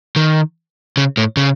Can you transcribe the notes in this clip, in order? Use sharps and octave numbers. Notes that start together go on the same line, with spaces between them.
D#3
C#3
A2
C#3